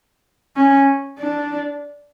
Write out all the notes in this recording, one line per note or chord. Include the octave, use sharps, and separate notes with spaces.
C#4
D4